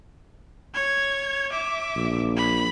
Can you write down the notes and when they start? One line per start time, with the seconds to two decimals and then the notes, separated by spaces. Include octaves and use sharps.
0.74 C#5 G#6
1.52 E5 D6
1.96 A#1
2.37 B5